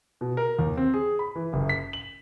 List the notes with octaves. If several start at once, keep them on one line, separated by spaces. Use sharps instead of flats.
B2
A#4
D#2
C4
G#4
B5
E3
F#1
B6
F#7